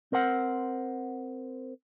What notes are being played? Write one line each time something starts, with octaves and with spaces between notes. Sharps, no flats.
C4 A#4 C5 F#5